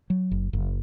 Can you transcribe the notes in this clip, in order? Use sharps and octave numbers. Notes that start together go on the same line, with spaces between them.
F#3
F#1
F#1